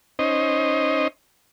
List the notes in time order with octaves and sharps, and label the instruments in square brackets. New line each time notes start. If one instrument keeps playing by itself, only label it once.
[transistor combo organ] C#4 D#4 C5 D#5